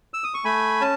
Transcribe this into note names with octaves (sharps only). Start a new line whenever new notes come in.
E6
D#6
C#6
A3 G#5 B5
C#4 A5